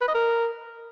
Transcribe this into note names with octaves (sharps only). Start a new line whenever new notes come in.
B4
D#5
A#4